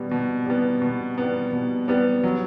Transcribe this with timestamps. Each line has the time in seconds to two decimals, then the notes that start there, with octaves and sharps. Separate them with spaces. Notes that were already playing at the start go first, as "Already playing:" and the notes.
Already playing: B2 G3 B3
0.11 B2
0.46 G3 B3
0.82 B2
1.18 G3 B3
1.53 B2
1.88 G3 B3
2.23 F#3